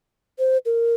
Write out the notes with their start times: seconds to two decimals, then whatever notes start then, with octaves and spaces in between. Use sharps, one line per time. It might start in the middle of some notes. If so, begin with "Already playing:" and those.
0.39 C5
0.66 A#4